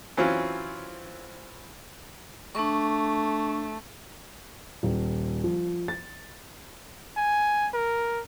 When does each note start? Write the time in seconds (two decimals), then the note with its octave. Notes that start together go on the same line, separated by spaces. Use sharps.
0.17 E3 F#3 C4 C#4 F4
2.55 A3 D4 C#6
4.83 D#1
5.44 F3
5.88 A6
7.17 G#5
7.74 A#4